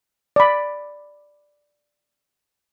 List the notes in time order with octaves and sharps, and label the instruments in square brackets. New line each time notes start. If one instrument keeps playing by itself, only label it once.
[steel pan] D5 B5